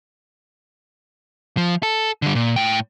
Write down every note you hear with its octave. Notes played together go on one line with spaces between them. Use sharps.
F3
A4
D3 G3
A#2
A2 G5